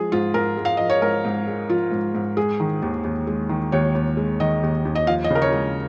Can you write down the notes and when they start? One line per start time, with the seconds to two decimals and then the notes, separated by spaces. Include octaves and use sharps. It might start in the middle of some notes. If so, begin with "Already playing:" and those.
Already playing: F3 G#3 G#4
0.12 G#2 F4
0.34 G#2 A#4
0.57 G#3
0.65 F5
0.77 F3 D#5
0.90 C#5
1.02 G#2 A#4
1.25 G#2
1.47 G#3
1.69 F3 F4
1.92 G#2
2.15 G#2
2.37 G#3 G#4
2.60 D#3
2.82 D#2
3.04 D#2
3.27 G#3
3.49 D#3
3.72 D#2 C#5
3.95 D#2
4.17 G#3
4.40 D#3 D#5
4.63 D#2
4.85 D#2
4.95 D#5
5.07 F3 F5
5.24 D#5
5.30 C#3 A#4
5.42 C#5
5.52 G#3